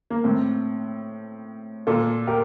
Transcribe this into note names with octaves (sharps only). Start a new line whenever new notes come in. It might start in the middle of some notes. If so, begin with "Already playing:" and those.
A#3
A2 C4
A#2 F4 A4
G4 A#4